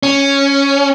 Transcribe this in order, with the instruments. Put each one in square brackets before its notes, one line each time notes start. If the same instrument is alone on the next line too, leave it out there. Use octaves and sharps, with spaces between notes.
[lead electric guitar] C#4